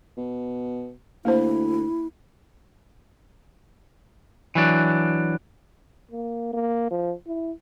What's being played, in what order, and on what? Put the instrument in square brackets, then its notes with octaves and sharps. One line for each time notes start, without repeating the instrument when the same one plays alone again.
[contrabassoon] B2
[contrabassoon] D2 [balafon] A#3 C5 [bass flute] E4
[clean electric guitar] E3 F#3 D4
[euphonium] A#3
A#3
F3
E4